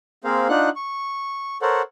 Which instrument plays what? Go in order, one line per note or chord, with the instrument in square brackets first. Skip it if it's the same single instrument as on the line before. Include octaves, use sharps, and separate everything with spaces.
[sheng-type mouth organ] A#3 C4 G#4 A#4 C5 F5
D4 D#4 F4 F#5 F#6
C#6
A4 A#4 C5 C#5 F#5